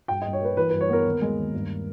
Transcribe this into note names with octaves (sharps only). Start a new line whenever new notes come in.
G2 G5
D#5
G2
C#5
A#3 B4
E3 B4
B4
G2
C#5
B3 A#4
D#2
G#3
D#2
G2